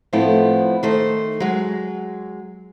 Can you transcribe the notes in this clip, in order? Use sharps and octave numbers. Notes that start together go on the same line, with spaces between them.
A2 F3 A3 B3 C4 E4
D#3 A3 C5
F#3 G#3